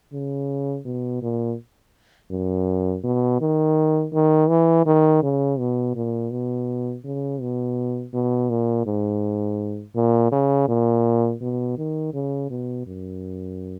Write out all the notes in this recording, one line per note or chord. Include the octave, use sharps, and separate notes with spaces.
C#3
B2
A#2
F#2
B2
D#3
D#3
E3
D#3
C#3
B2
A#2
B2
C#3
B2
B2
A#2
G#2
A#2
C#3
A#2
B2
D#3
C#3
B2
F#2